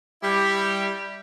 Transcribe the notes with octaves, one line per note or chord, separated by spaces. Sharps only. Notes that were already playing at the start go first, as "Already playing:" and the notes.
G3 E4 G4